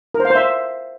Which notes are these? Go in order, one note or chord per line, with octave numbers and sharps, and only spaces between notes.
A#4
C5
F5
C5
E5